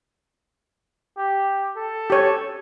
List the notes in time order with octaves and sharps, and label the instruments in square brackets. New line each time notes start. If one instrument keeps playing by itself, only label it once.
[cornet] G4
A4
[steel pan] G4 C#5